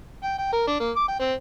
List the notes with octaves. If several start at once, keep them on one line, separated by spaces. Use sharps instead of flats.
G5
G5
A#4
D4
A#3
D6
G5
C4